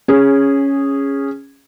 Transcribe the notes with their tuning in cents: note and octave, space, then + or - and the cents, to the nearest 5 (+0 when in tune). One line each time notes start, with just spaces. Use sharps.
C#4 +0 G#4 -10